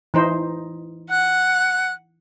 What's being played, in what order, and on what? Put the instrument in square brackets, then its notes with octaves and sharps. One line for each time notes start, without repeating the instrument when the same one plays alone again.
[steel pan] E3 D#4 C5
[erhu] F#5 [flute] F#6